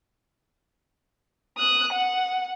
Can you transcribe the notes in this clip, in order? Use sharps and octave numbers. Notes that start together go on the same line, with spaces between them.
D#6 F#6
F#5